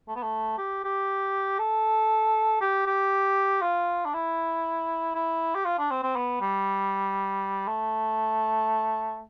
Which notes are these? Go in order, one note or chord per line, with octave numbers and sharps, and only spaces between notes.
A3
B3
A3
G4
G4
A4
G4
G4
F4
D4
E4
E4
G4
F4
D4
C4
C4
B3
G3
A3